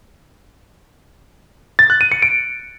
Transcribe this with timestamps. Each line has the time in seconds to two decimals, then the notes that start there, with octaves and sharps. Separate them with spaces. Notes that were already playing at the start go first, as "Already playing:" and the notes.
1.79 A6
1.90 F#6
2.01 D#7
2.12 C#7
2.22 D7